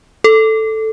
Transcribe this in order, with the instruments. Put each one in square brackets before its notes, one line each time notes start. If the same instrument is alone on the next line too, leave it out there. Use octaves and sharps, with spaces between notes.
[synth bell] A4